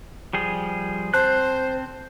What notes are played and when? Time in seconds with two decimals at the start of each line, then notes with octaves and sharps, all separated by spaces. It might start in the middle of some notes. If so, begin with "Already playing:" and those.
0.33 F3 G3 G#4
1.14 C4 C5 A5 F#6